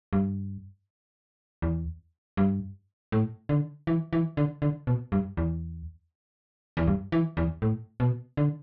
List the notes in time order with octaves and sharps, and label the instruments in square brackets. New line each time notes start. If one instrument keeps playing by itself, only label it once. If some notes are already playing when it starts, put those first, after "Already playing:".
[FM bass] G2
E2
G2
A2
D3
E3
E3
D3
D3
B2
G2
E2
E2
G2
E3
E2
A2
B2
D3